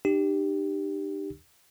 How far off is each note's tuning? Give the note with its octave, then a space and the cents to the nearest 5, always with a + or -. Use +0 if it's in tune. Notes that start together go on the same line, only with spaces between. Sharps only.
D#4 -45 G4 +0